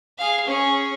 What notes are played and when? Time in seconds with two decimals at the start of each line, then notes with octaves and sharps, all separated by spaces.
0.18 G#4 F5
0.47 C#4 G#4